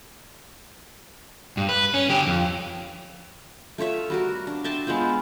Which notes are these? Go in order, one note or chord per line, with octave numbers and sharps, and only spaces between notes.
G2
B4
C#4
D3 G4
F2
A3 F4 C#5 E5
G3 F#4 A#4
D4
E5 G5 A5 C6
G#3 B3 F4 C5